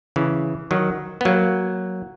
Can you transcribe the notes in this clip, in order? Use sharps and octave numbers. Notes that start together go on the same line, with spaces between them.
C#3 E3
D#3 F#3
B3
F#3 A#3